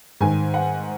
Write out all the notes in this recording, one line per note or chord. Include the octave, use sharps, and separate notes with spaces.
G#2 D#3 G#5
F#5